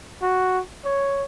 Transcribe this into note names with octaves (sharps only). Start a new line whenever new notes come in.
F#4
C#5